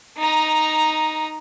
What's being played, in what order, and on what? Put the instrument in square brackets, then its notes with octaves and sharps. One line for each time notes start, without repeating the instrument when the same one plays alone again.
[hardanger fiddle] D#4 A#5